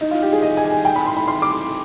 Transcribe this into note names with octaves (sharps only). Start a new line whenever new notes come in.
D#4
F4
G4
G#4
D#5
G#5
G#5
G5
B5
C6
B5
C6
D6